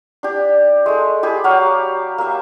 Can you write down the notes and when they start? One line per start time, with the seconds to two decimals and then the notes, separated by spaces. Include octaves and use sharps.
0.23 D4 G4
0.86 G#3 A3
1.23 G4 G#4 B5
1.44 F#3 F#4 G4 F5
2.18 A#3 E5